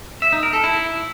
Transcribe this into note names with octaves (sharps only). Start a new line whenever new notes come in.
E5
D#4
A#4
A4
E4